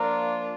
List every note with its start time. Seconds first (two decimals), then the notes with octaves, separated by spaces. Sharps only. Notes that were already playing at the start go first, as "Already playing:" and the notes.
Already playing: F3 A#3 D4 F4 A#4